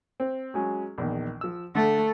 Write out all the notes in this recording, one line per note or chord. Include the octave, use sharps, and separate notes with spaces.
C4
F#3 G#3 C#4
A#1 E2 D#3
F3 E6
D3 A3 A4